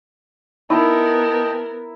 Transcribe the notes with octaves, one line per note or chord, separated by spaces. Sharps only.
B3 D#4 E4 A#4 D#5 G5 A5 A#5